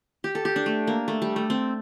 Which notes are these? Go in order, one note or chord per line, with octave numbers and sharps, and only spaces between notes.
G4
A4
G4
D4
A3
A#3
A3
G3
A3
C4